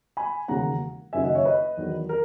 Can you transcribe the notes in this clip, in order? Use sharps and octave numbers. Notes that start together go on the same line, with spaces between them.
G#5 B5
E1 D#2 C#3 F#5 A#5
F#1 F#2 D#3 F#3 E5 G#5
D#5 F#5
C#5 E5
B4 D#5
E2 D#3 F#3
A#4